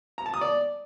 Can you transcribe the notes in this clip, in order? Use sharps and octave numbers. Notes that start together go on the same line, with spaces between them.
A#5
A5
D#6
D5